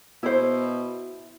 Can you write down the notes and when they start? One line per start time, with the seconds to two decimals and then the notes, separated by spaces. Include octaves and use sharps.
0.23 B2 E4 C5